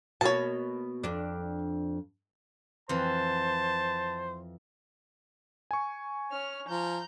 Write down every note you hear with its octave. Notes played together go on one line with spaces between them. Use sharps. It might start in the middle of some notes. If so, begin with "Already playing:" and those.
B2 A#3 C#5 A5
F2 D4
F2 E3 C5 A5
G#5 C#6
C#4 F6
F3 A#5 G6